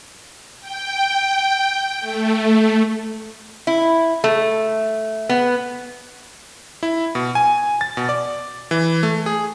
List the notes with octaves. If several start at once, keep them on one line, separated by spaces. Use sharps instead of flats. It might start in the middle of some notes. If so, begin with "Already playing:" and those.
G5
A3
E4
A3
B3
E4
B2
G#5
A6
B2
D5
E3
A3
G#4